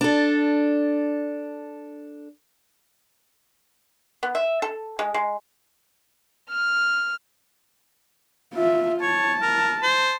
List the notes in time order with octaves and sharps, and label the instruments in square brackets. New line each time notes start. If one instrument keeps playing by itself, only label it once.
[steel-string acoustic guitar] D4 A4
[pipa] B3
E5
A4
G#3
G#3
[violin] F6
[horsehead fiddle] F4 E5
[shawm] C#5 [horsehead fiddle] A5
[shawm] A#4
C5